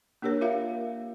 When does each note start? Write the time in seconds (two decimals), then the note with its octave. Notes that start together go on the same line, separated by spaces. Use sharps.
0.22 A#3 D4 G4 A#4 C#5
0.41 F4 A#4 E5 F5